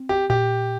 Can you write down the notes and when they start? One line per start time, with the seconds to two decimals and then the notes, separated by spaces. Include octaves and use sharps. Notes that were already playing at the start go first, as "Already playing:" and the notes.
Already playing: C4
0.09 G4
0.30 A#2 G4